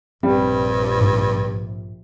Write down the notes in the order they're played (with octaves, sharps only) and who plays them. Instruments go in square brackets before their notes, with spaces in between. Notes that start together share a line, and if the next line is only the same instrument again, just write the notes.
[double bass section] A#1 C3 [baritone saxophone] G2 [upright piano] G3 [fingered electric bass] C4
[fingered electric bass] G#2